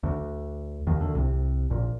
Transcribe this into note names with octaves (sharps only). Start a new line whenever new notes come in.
D2 D3
D#2 D#3
D2 D3
C2 C3
A#1 A#2